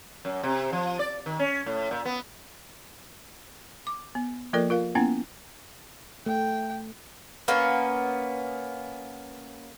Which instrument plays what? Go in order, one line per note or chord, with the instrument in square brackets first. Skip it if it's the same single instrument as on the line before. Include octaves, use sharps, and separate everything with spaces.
[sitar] F#2
C3
F3
D5
D#3
C#4
A2
A#2
B3
[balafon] D6
B3
F3 A#3 F4 A4 A#4 D5
F4 A#4 F5
A#3 B3 C#4 E4 F#5
[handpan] A3 [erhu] G5
[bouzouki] A#3 B3 C#4